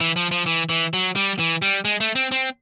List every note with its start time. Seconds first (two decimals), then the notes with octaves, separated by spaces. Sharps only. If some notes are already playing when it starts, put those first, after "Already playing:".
0.01 E3
0.16 F3
0.31 F3
0.46 E3
0.69 E3
0.93 F#3
1.16 G3
1.39 E3
1.62 G3
1.85 G#3
2.00 A3
2.15 C4
2.32 C4